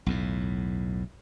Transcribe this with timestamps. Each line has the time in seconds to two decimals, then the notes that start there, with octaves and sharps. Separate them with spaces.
0.06 B1 E2 A2